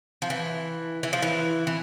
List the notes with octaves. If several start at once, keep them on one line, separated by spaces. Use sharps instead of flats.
F3
E3
E3
F3
E3
E3